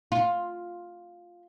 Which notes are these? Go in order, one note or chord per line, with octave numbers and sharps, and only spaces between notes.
F4